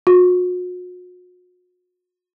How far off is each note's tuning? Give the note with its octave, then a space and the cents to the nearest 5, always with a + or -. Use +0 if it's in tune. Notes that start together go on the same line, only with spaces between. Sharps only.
F#4 -45